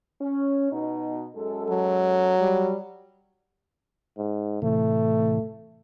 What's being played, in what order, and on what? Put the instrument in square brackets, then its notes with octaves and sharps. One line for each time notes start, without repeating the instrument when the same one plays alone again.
[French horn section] C#4
B2 D#4
F#2 G#3 A4
[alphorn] F#3
[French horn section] G3
[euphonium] G#2
[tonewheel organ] A2 C3 E3 [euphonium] A3